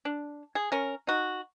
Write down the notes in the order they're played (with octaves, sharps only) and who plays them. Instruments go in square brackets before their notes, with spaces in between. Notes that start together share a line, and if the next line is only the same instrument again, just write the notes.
[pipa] D4
G#4
C#4 A#4
D#4 F#4